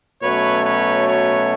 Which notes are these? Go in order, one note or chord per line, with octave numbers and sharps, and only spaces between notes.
B2 F#3 A3 C#4 B4 C#5
B4 C#5
B4 C#5